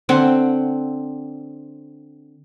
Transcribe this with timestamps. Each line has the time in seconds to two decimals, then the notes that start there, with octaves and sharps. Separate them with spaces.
0.09 D3 C4 F#5 G5